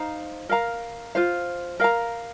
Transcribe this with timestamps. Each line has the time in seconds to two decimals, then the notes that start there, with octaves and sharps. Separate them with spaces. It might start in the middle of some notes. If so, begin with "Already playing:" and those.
Already playing: D#4 C5 F5 A#5
0.49 A#4 F5 A#5
1.15 F4 C5 F5
1.80 A#4 F5 A#5